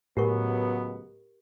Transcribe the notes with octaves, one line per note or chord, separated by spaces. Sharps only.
C#2 A2 F#3 B3 G4 A#4 C#6